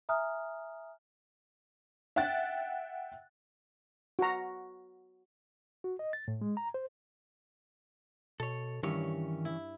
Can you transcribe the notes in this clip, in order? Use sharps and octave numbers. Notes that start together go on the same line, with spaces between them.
E5 G#5 A#5 D#6 F6 F#6
E5 F#5 G5 F#6 A6
F#4 A#5
F#4
D#5
A6
A2
G#3
A#5
C5
B2 A4 C#5
G2 D#3 E3 C#4 C#5
E4